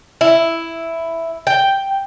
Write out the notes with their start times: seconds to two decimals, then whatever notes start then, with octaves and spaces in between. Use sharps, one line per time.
0.21 E4
1.47 G5